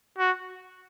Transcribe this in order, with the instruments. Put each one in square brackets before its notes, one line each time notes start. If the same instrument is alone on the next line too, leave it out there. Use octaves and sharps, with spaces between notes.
[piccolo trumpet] F#4